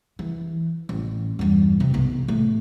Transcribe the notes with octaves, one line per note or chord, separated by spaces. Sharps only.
E3
A1
E2 G2
C3
B1
A2